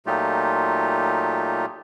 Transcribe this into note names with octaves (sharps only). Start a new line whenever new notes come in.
A#2 F#3 A3 D#4 F4 G4